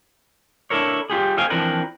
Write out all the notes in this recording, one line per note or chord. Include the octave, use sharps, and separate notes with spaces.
D4 E4 A4 A#4 C#5
G3 F4 G4 G#4
A4 C5 D#5 F5 G5 G#5
E3 F3 C4 D4 A#4 B4